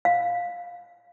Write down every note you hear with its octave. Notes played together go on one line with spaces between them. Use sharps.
F5